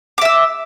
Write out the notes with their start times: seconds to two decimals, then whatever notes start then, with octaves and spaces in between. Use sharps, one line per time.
0.18 D6
0.22 E5
0.25 E6